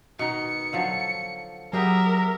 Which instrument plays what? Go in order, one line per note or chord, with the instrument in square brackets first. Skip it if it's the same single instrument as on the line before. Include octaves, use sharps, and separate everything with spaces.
[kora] B2 D#3 D#4 [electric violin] C#7
[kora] D3 F3 F#3
[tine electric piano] F#3 [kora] B3 G4 G#4 [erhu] A#4 [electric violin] E5